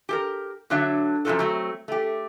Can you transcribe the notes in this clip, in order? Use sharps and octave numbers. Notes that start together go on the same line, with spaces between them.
G4 A4 A#4
D3 F#3 D4 C#5 E5
F#2 C3 D#3 F3 F#3 A4
F#3 A3 C4
A3 G4